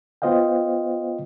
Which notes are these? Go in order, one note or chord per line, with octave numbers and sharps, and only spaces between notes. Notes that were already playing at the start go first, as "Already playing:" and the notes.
B3 F4 C5 D#5 F5 G5